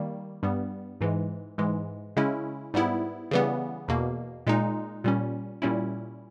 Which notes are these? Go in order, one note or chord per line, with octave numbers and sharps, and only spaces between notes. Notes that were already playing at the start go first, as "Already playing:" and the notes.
Already playing: D#3 G3 A#3
G2 G3 B3
G#2 E3 G#3
G#2 E3 G#3
C#3 G#3 C#4 E4
G#2 G3 B3 E4
C#3 E3 G3 B3
E2 B2 A#3
A#2 G#3 D#4
A#2 G3 C#4
A#2 G3 C#4 E4